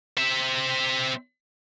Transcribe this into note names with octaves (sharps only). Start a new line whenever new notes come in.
C4 E5